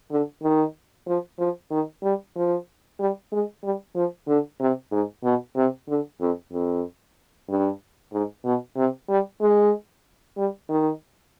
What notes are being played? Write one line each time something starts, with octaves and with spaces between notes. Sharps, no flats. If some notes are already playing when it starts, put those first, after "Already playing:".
D3
D#3
F3
F3
D#3
G3
F3
G3
G#3
G3
F3
D3
C3
G#2
B2
C3
D3
F2
F2
G2
G#2
B2
C3
G3
G#3
G3
D#3